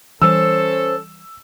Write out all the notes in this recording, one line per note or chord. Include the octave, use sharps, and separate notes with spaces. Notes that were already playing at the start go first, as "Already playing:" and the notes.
E3 G3 C#4 A4 C5 E6